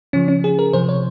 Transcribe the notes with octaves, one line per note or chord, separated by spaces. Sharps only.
C#3 F3 C#4
C#4
G#4
A#4
C3 F3 C5
C#5